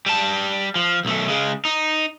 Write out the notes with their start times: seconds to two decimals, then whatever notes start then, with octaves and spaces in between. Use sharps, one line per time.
0.06 G3 A5
0.76 F3
1.05 B1 A3
1.28 C#3 G#3
1.65 D#4